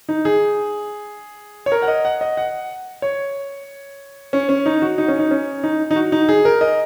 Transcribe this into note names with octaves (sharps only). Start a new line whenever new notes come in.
D#4
G#4
C#5
A#4
F#5
D#5
F#5
D#5
F#5
C#5
C#4
C#4
D#4
F#4
D#4
C#4
D#4
C#4
D#4
D#4
F#4
D#4
G#4
A#4
D#5